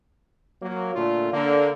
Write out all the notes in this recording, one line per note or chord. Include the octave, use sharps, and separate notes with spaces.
F#3 A#3
A#2 D3 A3 F4
D3 A#3